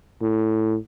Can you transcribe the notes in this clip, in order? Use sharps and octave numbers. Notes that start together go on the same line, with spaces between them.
A2